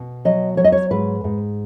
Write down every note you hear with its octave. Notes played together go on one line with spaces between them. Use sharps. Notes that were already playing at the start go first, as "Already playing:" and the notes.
Already playing: B2
F#3 D#5
F#3 C#5
D#5
C#5
G#2 B4
G#2